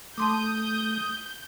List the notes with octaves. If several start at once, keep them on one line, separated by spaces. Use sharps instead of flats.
A3 A5 C6 D6 D#6 G6